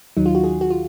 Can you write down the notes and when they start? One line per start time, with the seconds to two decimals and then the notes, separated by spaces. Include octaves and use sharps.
0.17 D#2 D#3 F#3 D#4
0.26 F4
0.35 F#4
0.44 G#4
0.61 F#4
0.71 F4